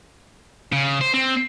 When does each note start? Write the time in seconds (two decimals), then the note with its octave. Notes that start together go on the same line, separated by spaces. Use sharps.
0.72 C#3
1.01 C5
1.14 C4